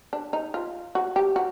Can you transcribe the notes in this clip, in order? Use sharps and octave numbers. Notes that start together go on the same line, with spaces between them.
D4
D#4
F4
F#4
G4
F#4